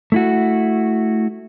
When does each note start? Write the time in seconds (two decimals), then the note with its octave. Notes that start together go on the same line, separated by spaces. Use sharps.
0.12 A3 E4 F#4